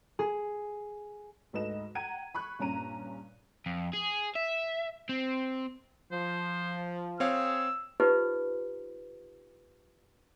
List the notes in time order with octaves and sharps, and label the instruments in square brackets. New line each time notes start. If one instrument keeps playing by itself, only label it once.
[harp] G#4
[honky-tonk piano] D2 G#2 A4 B4 D#5 E7
F#5 G5 A#5 G#6 D#7
B5 C#6 F#6
G2 A#2 C#4 A#5 D#7
[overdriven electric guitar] F2
G#4
E5
C4
[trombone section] F3 [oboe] C5
[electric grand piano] C4 C#5 F5 [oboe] G#4 [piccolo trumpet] E6
[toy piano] D#4 F4 G4 B4 C5